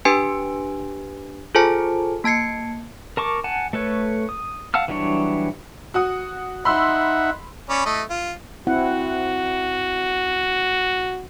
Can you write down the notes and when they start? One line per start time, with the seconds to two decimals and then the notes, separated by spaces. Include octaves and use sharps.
0.05 D4 G4 B4 G#5 D7
1.55 F4 G#4 A4 C5 G#5 A5
2.24 A#3 A5 G#6 C7 C#7
3.17 A#4 A5 C#6 D6
3.44 F#5 G#5 A5
3.73 A3 A4 B4 C#5
4.29 D#6
4.74 F5 F#5 A5 E6 F6
4.88 E3 F#3 G3 D4 C#5
5.94 F#4 F#5 D#6
6.65 D#4 E5 F#5 B5 C6 E6
7.70 C#4 D5 B5
7.85 A3 E4 D#5
8.10 F4
8.67 C4 E4 F#4 F#5